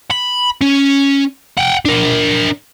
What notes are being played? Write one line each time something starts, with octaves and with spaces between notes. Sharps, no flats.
B5
C#4
F#5 G5
D4 A#4